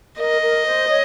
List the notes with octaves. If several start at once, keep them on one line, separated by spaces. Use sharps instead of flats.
A#4 D#5
A#4
C5
C#5